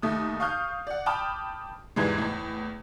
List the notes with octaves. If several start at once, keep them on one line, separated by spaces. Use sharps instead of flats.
D#2 A3 D#6
F5 C#6 D#6 F6 G6
D5 F#5
G5 A5 B5 D6 D#6 F6
E2 G#2 E3 G3 G#3
E2 A2